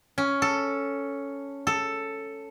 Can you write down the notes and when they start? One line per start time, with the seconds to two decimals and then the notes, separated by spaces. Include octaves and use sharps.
0.18 C#4
0.42 A4
1.67 A4